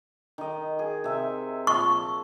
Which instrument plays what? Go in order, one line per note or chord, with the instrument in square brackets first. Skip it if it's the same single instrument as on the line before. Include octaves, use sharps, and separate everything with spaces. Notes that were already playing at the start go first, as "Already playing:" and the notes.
[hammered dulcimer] D#3 D#5
G#4
C3 E5
[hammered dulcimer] A#2 [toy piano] C#6
[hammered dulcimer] A5